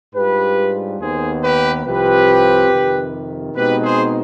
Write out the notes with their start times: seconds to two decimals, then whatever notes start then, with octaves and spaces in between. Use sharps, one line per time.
0.14 G#2 G3 D4 F4 G4 B4
0.99 D#2 D#3 B3 G#4 C5
1.42 G4 B4
1.85 C2 C3 F3 C4 F4 G4 B4
2.69 F2 C3 D#3
3.55 B2 G#3 C4 D#4 G4 B4
3.83 G#4 C5